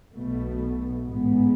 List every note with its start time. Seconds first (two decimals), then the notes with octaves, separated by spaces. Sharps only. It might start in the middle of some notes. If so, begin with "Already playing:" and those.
0.13 B1 B2 A3
1.04 A1 G#2 G#3 B3